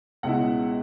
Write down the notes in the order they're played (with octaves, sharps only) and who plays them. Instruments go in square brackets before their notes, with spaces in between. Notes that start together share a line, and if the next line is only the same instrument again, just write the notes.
[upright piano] C#2 B2 G#3 B3 E4 F#5